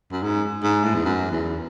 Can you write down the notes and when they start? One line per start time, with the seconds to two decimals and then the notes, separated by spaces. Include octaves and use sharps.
0.11 F#2
0.23 G#2
0.63 G#2
0.84 A2
0.94 E2
1.05 F#2
1.31 E2